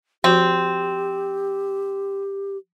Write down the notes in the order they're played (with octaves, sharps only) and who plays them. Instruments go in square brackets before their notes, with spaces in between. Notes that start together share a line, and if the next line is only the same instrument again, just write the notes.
[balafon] F3 F#4 [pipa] C4 [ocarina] G4